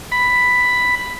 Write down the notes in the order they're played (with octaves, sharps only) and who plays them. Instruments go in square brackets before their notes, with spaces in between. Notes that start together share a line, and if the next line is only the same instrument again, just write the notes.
[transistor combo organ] B5